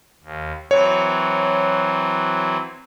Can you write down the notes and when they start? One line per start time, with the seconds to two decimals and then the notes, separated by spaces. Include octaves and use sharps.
0.24 D#2
0.71 E3 F#3 C4 C#5